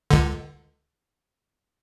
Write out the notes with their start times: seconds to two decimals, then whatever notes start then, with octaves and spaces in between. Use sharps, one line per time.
0.11 C#2 D3